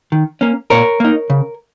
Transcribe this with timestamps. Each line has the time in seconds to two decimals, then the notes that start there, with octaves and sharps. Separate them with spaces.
0.12 D#3
0.41 A#3 C#4
0.70 A#2 A#4 C#5
1.00 A#3 D#4
1.30 C#3